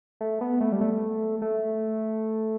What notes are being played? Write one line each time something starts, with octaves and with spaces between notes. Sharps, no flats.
A3
B3
A3
G3
A3
A3